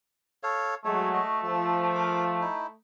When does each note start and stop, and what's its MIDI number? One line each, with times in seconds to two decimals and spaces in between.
0.43 0.75 69
0.43 0.75 73
0.43 0.75 77
0.85 1.20 54
0.85 1.20 56
0.85 2.75 57
0.85 1.09 73
1.14 1.41 66
1.14 1.41 75
1.44 2.45 53
1.44 1.76 69
1.95 2.24 70
1.95 2.24 86
2.41 2.67 63
2.41 2.67 64